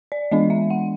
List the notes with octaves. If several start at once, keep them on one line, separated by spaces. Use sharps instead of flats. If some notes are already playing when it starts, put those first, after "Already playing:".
D5
E3 G#3 B3 D4 D#5
E5
F#5